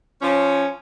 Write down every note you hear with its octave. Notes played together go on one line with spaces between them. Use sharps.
F3 C#4